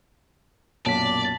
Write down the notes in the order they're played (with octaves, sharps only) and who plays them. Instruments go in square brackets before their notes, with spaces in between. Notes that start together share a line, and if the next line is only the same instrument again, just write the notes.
[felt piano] B1 F#2 A#2 [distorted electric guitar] D5 [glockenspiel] A5 B6